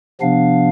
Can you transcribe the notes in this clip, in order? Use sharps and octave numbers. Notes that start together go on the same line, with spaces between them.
C3 F3 B3 D4 F5